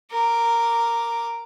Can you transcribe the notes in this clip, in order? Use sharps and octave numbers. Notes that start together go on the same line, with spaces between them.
A#4 D6